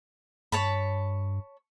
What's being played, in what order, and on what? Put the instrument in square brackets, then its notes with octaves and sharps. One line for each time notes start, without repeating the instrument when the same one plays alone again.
[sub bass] G2 [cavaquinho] C#5 A5 B5